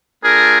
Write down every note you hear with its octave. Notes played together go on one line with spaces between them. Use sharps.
A3 D4 F4 G#4 A#4